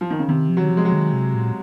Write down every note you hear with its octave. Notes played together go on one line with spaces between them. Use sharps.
F3
D#3
C#3
C3 D#3
F3
F#3
D#3
F3
G#3
F#3
D#3
C3
A#2